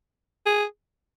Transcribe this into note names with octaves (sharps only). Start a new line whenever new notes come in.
G#4